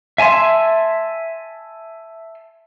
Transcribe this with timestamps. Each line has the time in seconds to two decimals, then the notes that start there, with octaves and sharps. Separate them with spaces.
0.18 E5 G#5 A5 C6